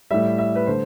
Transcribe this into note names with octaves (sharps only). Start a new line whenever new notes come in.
A2 G3 E5
E5
B4
D3 A3 C5